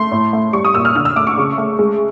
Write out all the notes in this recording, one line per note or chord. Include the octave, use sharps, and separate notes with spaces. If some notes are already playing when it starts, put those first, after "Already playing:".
Already playing: A3 C6
A2
A3
G3 C#6
D#6
A#2 E6
F6
D3 F6
E6
A3 D6
C#6
C#3
A3
G#3